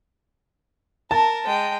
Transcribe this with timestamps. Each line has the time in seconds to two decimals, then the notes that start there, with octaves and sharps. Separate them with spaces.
1.11 A#4 A5
1.45 G#3 G5